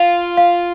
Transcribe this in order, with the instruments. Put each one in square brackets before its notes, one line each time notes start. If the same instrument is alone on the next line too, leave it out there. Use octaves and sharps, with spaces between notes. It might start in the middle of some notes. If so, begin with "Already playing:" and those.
Already playing: [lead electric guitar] F4 [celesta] F5
[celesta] F5